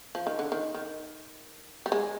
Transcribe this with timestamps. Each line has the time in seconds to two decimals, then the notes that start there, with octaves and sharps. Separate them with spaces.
0.15 F3
0.27 D#3
0.39 D3
0.52 D#3
0.74 D#3
1.86 G3
1.92 G#3